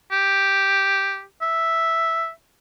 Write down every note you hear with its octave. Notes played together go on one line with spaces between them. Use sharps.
G4
E5